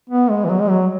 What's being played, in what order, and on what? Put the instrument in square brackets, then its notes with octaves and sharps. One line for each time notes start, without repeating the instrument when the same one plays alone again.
[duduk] B3
G#3
E3
F#3
G#3
F#3